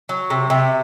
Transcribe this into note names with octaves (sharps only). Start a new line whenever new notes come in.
F#3
C3
C3